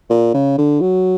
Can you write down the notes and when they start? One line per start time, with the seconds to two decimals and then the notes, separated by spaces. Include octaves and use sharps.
0.10 A#2
0.34 C#3
0.58 D3
0.81 F#3